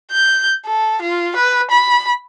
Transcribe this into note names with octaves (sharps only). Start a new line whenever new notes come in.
G6
A4
F4
B4
B5